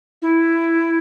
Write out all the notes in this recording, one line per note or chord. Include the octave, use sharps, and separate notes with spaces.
E4